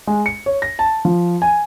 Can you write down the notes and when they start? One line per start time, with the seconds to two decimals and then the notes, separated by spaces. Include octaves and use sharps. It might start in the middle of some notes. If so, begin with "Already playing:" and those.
0.07 G#3
0.26 C#7
0.46 C#5
0.62 A#6
0.79 A5
1.05 F3
1.42 G#5